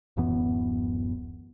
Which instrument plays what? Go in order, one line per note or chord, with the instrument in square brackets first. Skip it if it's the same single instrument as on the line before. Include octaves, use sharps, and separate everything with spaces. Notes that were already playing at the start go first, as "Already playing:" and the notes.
[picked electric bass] D1 F#2 E3 B3